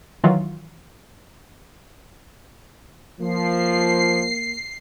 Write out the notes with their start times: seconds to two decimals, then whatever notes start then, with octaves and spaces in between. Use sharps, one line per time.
0.24 D#3 E3 F#3 F4
3.20 F3 A#3 C7